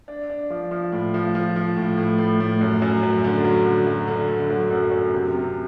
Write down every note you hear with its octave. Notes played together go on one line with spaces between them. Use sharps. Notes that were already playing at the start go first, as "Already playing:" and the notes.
D4
D4
F3
F3
A2
F3
F3
F3
A2
A2
A2
A2
F#2
F#2
F#2
D3
F#3
D3
F#3
D3
D3
F#3
F#2
F#2
C3
C3